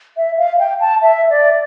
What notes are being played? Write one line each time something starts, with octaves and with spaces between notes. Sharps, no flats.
E5
F5
G5
A5
E5
D5